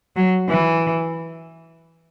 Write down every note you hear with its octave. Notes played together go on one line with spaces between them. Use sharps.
F#3
E3